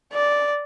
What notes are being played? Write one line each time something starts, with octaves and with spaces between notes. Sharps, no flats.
D5